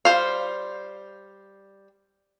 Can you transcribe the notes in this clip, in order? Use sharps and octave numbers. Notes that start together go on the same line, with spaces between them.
G3 C5 F5